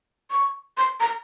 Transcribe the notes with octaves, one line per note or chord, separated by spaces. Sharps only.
C#6
C6
A#5